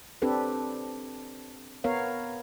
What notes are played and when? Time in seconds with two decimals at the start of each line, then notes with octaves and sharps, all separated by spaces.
0.22 C4 D4 G4 A4 B4
1.84 B3 A#4 C#5 F5